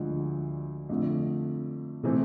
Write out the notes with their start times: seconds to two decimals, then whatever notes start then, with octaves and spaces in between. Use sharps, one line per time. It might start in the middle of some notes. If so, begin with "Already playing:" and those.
Already playing: D2 D3 F3 G#3
0.89 F2 D3 F3 A3
2.03 C3 E3 A3 C4